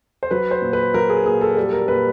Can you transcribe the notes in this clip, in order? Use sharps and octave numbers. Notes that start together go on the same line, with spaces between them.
C5
F#3 B4
C5
A#2
B4
F#3 A#4
G#4
A#2 G#4
A4
G3 A4
A#4
A#2 B4